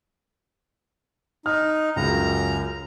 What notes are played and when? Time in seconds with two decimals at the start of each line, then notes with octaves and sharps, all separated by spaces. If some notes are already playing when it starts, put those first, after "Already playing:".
1.46 D#4 F6
1.96 C#2 F#2 C#3 A#5